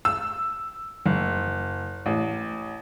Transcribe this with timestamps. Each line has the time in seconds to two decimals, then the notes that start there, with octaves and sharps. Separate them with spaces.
0.05 E6
1.06 F#1
2.06 A1